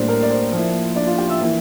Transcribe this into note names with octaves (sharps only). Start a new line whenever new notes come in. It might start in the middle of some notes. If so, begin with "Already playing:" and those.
Already playing: A2 G3 A#3 D4 C5
A#4
D5
C5
F3 A#3 E4
D4 D5
F4 F5
G4 G5
E5 E6
E3 A#3 E4